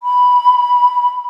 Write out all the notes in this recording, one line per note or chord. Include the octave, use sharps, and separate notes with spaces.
B5